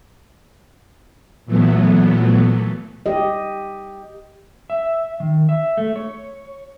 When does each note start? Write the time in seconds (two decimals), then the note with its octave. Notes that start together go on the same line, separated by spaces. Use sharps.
1.46 A#2 E3 F#3 A3 B3
3.06 G4 D#5
4.70 E5
5.20 D#3
5.49 E5
5.77 A3
5.96 C#5